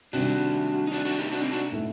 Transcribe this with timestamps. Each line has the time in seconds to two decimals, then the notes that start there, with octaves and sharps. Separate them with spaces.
0.13 C3 D#3 G3 C4 D4 F#4
0.87 D#4
0.92 D4 F#4
1.05 D4 F#4
1.18 D#4 G4
1.32 D4 F#4
1.42 C4 D#4
1.52 D4 F#4
1.72 A2 A3 D#4